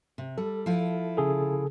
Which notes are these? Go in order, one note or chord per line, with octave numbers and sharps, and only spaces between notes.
C3
G3 A4
F3 E4 F4
C#3 G#4 A4